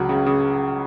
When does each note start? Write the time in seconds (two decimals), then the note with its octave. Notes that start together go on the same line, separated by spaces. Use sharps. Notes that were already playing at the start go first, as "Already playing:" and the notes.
Already playing: C#2 F#3
0.09 C#3
0.26 C#3